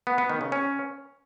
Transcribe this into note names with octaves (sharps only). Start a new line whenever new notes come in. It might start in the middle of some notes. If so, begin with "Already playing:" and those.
B3
B3
D#3
C#3
C#4